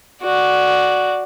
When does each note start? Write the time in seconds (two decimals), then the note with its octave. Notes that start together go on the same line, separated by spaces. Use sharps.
0.22 F#4 D5